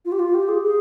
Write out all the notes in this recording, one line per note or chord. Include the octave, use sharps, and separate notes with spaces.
F4
G4
F4
G4
G#4
G#4